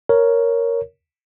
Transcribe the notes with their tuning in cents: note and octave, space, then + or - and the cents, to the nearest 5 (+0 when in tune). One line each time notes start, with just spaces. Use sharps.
A#4 +0 C#5 +5